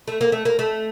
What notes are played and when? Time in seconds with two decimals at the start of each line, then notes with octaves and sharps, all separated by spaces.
0.08 A3
0.21 A#3
0.32 A3
0.45 A#3
0.59 A3